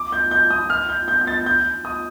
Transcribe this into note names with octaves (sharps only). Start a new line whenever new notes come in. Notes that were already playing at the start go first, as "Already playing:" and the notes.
Already playing: D6
G6
G6
D#6
F6
G6
G6
G6
A6
G6
D#6